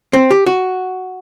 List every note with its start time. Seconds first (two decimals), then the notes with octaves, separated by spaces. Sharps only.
0.13 C4
0.30 G4
0.46 F#4